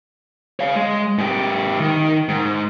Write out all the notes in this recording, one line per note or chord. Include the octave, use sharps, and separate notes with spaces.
C#5 F5
G#3
G#2 G4
D#3
G#2